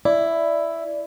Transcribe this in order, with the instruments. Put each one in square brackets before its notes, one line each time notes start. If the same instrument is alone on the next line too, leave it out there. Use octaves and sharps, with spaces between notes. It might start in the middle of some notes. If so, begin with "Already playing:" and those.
[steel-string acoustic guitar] E4 [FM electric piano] D5